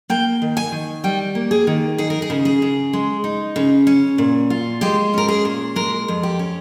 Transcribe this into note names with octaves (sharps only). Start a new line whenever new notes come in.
A#3 G5
D#3
G#5
D#3
G3 G5
A#3
G#4
D#3
D#4 G#4
A#4
G#4
C#3
G#4
C#3
G#3
D#4
C#3
C#4
A#2
F4
G#3 G4
C#4 A#4
G#4
A#2
G#3 A#4
F2
G4
C#4